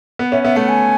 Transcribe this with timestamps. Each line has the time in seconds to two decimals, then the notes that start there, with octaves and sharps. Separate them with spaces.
0.19 B3
0.32 C#4 E5
0.43 B3 E5
0.56 A3 F#5
0.69 G#5